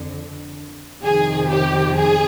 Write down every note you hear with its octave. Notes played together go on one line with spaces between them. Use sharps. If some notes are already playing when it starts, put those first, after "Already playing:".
Already playing: F2 D3
F2 C3 D#3 G#4
G4
G#4